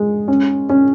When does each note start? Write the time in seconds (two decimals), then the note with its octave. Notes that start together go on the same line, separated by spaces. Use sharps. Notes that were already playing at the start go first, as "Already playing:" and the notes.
Already playing: G#3
0.28 C#4
0.70 C#4